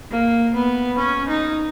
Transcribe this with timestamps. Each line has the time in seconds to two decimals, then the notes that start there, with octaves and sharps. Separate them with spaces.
0.11 A#3
0.55 B3
0.98 C#4
1.28 D#4